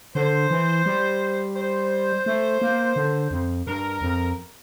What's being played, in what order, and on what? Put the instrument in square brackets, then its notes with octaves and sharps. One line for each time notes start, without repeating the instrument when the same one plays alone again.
[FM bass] D3 [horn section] C5
[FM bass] E3
G3
[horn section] C5
[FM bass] A3
A#3
D3
F2
[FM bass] G2 [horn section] A#4
[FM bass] F2